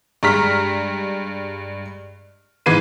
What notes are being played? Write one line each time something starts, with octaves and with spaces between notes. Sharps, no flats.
G2 G#3 A#5 F6 B6
G#2 E3 B4 G#6 C7 D#7